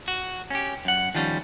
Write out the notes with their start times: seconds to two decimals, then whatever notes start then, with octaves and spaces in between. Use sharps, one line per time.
0.08 F#4
0.50 C#4 G4
0.85 F#2 F#5
1.15 D#3 F3 G3 A#3 C#4